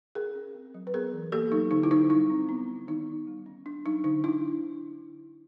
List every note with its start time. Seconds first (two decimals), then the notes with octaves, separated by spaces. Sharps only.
0.15 C#4 G#4 A#4
0.35 C#4
0.55 C4
0.74 F#3
0.87 B4
0.94 B3 G#4 A#4
1.12 E3
1.32 A#3 G4 A4
1.52 F#3 D#4
1.71 D3 D#4
1.83 E4
1.91 D3 D#4
2.10 G3 D#4
2.30 C4
2.49 B3
2.68 B3
2.87 D#3 D#4
3.07 D#3
3.27 G3
3.46 C#4
3.66 D4
3.85 F#3 D#4
4.04 D3 D#4
4.23 D3 D4 E4